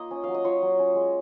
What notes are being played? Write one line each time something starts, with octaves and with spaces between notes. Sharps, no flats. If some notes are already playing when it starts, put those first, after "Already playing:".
Already playing: A#3 D#4 F4 D#5
C#4
F#3 F5
D#5
F4 C#5
F#3
C#4
G#3